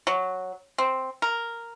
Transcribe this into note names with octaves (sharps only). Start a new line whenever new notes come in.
F#3
C4
A#4